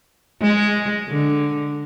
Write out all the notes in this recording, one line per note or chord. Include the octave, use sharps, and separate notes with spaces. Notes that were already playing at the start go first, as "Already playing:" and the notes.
G#3
D3